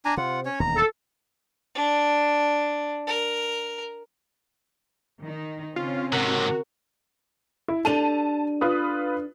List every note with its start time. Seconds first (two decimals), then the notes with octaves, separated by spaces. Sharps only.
0.05 D4 G#5 A#5
0.17 C3 F4 F#5
0.45 C#4 C#5
0.60 E1 D#2 A#5
0.76 A4
1.75 D4
3.07 A#4
5.23 D#3 D#4
5.76 C#3 C4 C#4 F4
6.13 G#2 C3 F#4 A#4
7.68 E4
7.85 D4 G4 A4 A5 D#7 F7
8.61 F4 B4 D#6